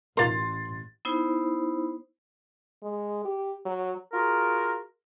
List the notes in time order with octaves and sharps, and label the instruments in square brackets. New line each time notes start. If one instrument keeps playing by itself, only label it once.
[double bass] A1 [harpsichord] F4 A#4 [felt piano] C6 A6
[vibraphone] B3 D#4 E4 C5
[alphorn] G#3
G4
F#3
[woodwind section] F4 F#4 G#4 A#4